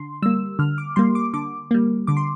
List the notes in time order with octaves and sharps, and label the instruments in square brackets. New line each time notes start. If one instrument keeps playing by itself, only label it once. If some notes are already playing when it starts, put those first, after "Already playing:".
Already playing: [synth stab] D3 C6
G3 A#3 E6
D3 F6
D6
G3 A#3 C6
D6
D3 D6
G3 A#3
D3 D6
C6